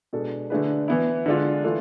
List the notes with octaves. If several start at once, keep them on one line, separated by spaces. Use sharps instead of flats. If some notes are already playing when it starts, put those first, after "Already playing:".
B2 G#3 D4 A4
D3 A3 D4 G#4 B4
E3 B3 E4
D3 G#3 D4 F4
E3 A3 D4 F4 A4